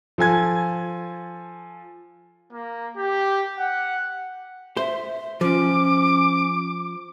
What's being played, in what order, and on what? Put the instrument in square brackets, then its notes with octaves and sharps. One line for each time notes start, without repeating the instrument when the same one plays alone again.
[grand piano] F3 A4 G#5 G#6
[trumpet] A#3
G4
F#5
[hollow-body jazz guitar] C5 [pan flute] E5
[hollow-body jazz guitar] F3 [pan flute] C#4 [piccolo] D6